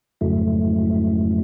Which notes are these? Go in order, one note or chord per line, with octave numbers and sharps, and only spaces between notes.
F2 G#2 C#3 F#3 A3 E4